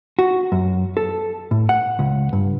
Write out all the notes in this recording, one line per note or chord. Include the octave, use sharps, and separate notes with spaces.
F#4
F#2
A4
A2
F#5
C#2
G2